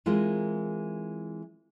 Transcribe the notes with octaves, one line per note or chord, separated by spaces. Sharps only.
E3 G#3 C4 F4 A#4